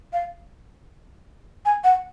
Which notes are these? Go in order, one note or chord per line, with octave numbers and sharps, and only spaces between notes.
F5
G#5
F#5